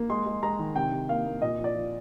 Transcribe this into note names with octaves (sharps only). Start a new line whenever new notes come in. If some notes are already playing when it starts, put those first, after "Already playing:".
Already playing: A#3
G#3 C6
G#3
G#3 A#5
D#3
C3 G5
C3
A#3 F5
A#3
A#2 D#5
F3
D5
F3